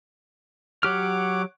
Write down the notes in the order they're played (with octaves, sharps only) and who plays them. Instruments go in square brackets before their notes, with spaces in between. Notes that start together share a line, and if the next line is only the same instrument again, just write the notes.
[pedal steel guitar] F#3 G4 F6 [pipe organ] C#5 F#5 D6